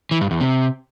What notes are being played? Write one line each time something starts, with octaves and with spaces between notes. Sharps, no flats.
E3
G2
E2
C3